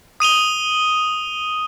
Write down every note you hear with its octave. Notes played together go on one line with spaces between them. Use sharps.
D#6 D#7 F7 G7